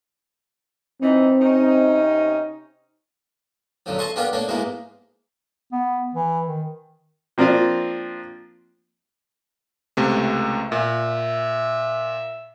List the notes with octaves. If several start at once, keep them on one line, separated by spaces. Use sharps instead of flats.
E3 C4 D#4
C3 C#4 D#4
B1 F#2 D3 F3
A4 D#5 A5 C6 C#6 D#6
B3 D4 F4 G4 A#4 G5
A3 A#3 D4 C#5
G#2 B2 G#3 A#3 E4
B3
E3
D#3
F3 A#3 C4 D4 F4
C#2 C3 A3
A#2 E5